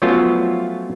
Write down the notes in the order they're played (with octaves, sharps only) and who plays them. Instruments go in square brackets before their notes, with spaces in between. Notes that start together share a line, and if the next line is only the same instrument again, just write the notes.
[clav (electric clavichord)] F3 F#3 A3 B3 C#4 F4